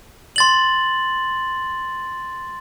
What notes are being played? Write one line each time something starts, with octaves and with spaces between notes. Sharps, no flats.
C6 A6 F#7